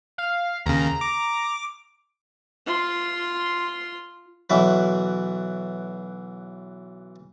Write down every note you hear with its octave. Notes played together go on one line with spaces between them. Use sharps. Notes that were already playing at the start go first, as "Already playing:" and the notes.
F5
D#2 C#3 A#5
D6
F4 C6
B1 E3 F#3 B4